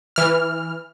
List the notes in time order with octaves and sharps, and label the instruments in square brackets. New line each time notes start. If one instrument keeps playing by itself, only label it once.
[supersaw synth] E3 F6